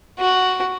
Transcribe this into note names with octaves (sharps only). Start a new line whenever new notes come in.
F#4